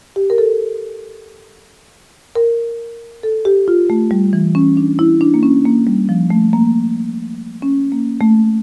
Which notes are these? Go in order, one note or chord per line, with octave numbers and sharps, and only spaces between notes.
G4
A#4
A4
A#4
A4
G4
F4
A3
G3
E3
C#4
D4
E4
D4
A#3
C#4
A#3
G3
F3
A3
A#3
C#4
A#3
A3